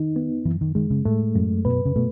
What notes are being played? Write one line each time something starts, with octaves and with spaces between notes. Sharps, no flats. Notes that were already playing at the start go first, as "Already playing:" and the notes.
Already playing: D#3 D#4
B3
F#2 E3
D#3
D#3 G#3
C#3
A2 A3
F#2
B2 B4
C#3
B2 A3